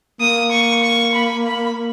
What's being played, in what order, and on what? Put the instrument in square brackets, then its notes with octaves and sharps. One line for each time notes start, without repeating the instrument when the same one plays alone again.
[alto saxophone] A#3 [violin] D#6
[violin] C#6
C#6
B5
B5